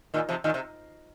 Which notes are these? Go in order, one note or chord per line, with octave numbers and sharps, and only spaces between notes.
A#2 D#3
C3 F3
A#2 D#3
C3